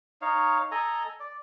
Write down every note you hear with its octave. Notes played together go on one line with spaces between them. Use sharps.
D#4 C#5 F5
A4 D#5 G#5 A#5
D5